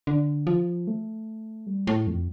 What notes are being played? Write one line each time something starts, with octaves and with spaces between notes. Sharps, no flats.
D3
F3
A3
G3
A2
F2